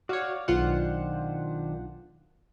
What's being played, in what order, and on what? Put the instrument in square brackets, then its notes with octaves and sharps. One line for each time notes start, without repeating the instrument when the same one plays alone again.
[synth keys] F#4 C#5 [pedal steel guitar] D5 F5
[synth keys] B1 F4 F#5 [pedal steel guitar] D#3 D4 C5